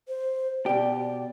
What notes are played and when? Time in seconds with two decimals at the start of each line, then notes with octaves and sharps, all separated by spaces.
0.08 C5
0.66 B2 G4 D5